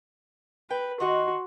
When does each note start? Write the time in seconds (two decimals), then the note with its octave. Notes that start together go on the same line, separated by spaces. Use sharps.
0.70 B4 G5
1.00 D#3 F#4 D#5 F#5 C6